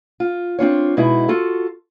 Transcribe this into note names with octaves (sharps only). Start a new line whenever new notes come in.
F4
C4 D4 F4 C#5
B2 G#3 D#4 E4
F4 F#4 A4